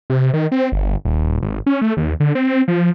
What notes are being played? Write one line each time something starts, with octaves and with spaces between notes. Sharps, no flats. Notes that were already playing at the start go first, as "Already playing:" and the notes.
C3
D#3
C4
G1
D#1
G#1
C#4
A3
D#2
D3
C4
F3